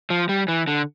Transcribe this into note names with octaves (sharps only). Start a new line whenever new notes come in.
F3
G3
E3
D3